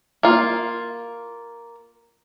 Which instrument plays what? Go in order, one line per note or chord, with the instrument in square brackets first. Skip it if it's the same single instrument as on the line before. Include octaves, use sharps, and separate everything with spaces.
[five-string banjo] A#3 F4